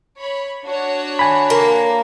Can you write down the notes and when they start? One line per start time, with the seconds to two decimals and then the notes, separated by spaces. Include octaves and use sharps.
0.18 C#5 B5
0.64 D4 F#4 C#5
1.19 G#5 B5
1.50 A#3